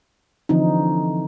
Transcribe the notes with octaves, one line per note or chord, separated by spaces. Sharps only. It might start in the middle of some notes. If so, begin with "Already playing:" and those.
D3 E3 F3 C4 D#4